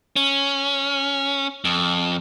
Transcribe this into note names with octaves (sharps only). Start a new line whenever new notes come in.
C#4
F2